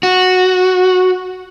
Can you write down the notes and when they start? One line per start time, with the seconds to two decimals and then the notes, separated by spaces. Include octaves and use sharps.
0.03 F#4